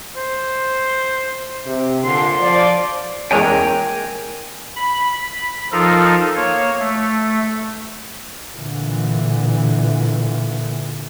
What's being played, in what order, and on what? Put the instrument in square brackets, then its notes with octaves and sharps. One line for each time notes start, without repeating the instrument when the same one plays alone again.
[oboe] C5
[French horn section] C3
[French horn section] A#2 D3 [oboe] C6
[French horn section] F3 D5
[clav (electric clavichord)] E2 G#3 C#4 [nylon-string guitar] A#3 [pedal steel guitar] G5 G#5 A#5
[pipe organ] B5
B5
F3 D#4 F4 A4 A#4
A#3 C#5
A3
[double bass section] A#2 D3 E3